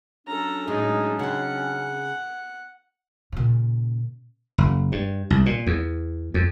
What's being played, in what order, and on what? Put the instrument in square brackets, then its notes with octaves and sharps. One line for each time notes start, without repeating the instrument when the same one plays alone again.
[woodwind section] F#3 C#4 D4 [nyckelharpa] A4 A#5
[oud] A2 G#3 [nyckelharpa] D#4
[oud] C#3 C4 [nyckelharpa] F#5
[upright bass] A#2 C#3
[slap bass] F#1
G2
C2
A#2
E2
F2